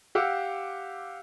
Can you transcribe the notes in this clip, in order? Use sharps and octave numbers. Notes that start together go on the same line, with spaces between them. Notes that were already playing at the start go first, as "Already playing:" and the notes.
G4 F5 F#5 D6 E6